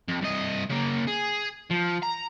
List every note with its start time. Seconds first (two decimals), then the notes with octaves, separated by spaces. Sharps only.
0.09 F2
0.22 C2 D#5
0.70 C#3 A#3
1.08 G#4
1.71 F3
2.03 A#5